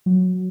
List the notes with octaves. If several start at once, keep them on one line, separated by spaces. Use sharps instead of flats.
F#3